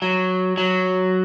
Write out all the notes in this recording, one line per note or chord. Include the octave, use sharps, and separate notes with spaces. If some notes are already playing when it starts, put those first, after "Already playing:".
F#3
F#3